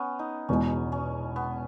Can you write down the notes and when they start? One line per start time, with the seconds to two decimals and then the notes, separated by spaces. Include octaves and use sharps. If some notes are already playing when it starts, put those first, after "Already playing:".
Already playing: B3 C#4
0.19 D#4
0.49 E1 E2 B2 G#3 C#4
0.92 C#4
1.36 B3